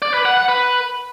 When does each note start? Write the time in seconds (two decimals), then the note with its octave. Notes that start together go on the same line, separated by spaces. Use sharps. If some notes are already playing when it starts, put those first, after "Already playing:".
0.02 D5
0.14 B4
0.25 F#5
0.37 F#5
0.48 B4